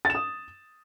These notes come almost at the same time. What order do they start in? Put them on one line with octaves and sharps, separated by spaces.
A6 E7 D#6